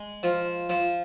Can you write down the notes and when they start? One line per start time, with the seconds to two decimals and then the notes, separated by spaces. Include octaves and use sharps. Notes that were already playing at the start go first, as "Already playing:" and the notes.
Already playing: G#3
0.23 F3 F4
0.69 F3